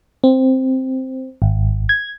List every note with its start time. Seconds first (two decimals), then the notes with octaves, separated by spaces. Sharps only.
0.24 C4
1.42 G#1
1.89 G#6